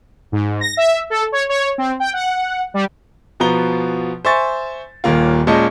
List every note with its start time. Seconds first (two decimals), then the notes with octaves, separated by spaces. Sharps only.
0.32 G#2
0.61 A#6
0.77 E5
1.10 A4
1.32 C#5
1.49 C#5
1.78 C4
2.00 G5
2.13 F#5
2.74 G3
3.40 B2 F3 B3 A#5 G7
4.25 C5 E5 G#5 C#6 A6
5.04 D#1 D#2 A#3 F4
5.47 A#2 G#3 C#4 D#5 A5 G6